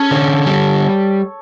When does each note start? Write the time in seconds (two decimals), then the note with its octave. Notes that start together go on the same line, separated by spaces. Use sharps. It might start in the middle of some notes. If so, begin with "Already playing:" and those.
Already playing: C#4 A4
0.11 D3 C#5
0.46 G3